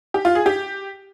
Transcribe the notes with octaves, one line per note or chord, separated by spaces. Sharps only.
G4
F4
G#4
G4